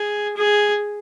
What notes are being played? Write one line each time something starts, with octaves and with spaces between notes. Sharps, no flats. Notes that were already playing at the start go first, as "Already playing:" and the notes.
Already playing: G#4
G#4